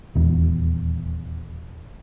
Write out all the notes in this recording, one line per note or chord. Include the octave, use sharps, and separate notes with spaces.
D#1 E2